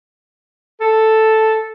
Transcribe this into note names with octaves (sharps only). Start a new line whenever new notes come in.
A4